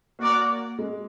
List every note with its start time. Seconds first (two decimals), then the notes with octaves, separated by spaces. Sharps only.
0.19 A#3 F#4 A#4 D5 F#5
0.79 G#3